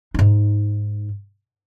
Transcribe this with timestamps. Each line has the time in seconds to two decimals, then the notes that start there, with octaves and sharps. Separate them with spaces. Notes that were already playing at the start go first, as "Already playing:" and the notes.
0.14 G#2 D#4